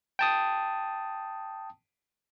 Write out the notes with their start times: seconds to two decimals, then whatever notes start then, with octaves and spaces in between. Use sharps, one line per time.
0.19 G5 A5 D#6